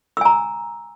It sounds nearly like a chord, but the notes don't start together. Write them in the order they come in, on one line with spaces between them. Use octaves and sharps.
E6 G#5 A#5